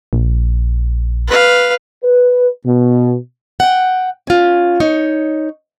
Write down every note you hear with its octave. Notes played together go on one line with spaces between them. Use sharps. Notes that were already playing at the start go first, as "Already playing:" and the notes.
A#1
B4 F5
B4
B2
F#5 G5
C#4 F4
D#4 C#5